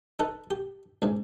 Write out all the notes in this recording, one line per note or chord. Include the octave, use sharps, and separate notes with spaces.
D#4 A4 B4
G4
C#2 G#2